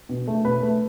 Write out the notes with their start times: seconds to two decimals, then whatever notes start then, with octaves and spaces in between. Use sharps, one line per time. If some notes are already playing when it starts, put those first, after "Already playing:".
0.09 B2
0.27 A3
0.45 B2 B4
0.62 A3